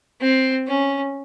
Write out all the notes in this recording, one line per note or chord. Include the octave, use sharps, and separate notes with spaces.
C4
C#4